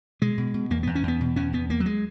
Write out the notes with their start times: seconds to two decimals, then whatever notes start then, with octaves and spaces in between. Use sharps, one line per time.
0.22 B2 G#3
0.38 B2
0.54 B2
0.70 E2 A#3
0.83 E2 B3
0.95 C#4
1.03 E2 B3
1.21 B2
1.36 E2 C#4
1.53 E2 B3
1.70 E2 A#3
1.80 F#3
1.86 G#3